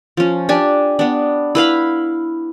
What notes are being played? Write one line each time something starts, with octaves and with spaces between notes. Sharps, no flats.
F3 C#4
D4 G4 G#5 A5
B3 D4
E4 B4 F5 B5